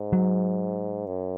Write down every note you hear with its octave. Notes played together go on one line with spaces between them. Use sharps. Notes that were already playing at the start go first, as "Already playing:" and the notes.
Already playing: G#2
F#3
F#2